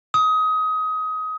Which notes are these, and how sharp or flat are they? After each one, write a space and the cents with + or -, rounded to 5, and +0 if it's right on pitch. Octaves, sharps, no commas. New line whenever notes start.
D#6 +20